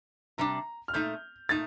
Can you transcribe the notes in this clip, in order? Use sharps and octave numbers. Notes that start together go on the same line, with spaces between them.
C3 G3 D4 A#5
F6
A#2 A3 D#4 G6
A#2 A3 D#4 A6